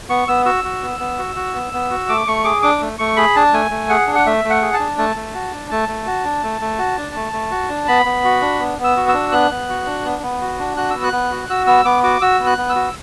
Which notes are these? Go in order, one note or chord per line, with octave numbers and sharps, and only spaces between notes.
B3 C#6
B3 E6
F#4 E6
F#4
B3
B3
F#4
F#4
B3
B3
F#4
A3 D6
A3 C#6
G#4 D6
D4 D6
A3
A3 C#6
G#4 B5
D4 A5
A3 G#5
A3
G#4 F#5
D4
F#5
A3 E5
A3
F#5
G#4
A5
D4
A3 A5
A3
F#4
D4
A3 A5
A3
F#4
D4
A3
A3
F#4
D4
A3
A3
F#4
D4
B3 B5
B3
F#4
D4
B3
B3
E6
F#4
D4 E6
B3 F#6
B3
F#4
D4
B3
B3
F#4
D4
F#4 F#6
B3 E6
F#6
B3
F#4
F#4 E6
B3 E6
B3 D6
F#4 D6
F#4 E6
B3
F#6
B3
E6
F#4